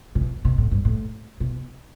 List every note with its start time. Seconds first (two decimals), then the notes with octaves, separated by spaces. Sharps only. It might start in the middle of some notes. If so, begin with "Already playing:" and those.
0.15 C3
0.21 B2
0.45 B2
0.58 A2
0.71 G2
0.85 A2
1.40 B2